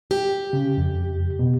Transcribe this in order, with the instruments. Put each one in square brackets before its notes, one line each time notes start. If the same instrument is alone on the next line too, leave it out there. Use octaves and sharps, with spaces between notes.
[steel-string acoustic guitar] G4
[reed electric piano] C#3
F2
B2